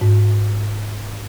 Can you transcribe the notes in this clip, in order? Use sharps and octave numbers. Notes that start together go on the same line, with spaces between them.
G#2